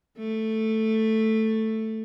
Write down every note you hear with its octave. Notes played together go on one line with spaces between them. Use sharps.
A3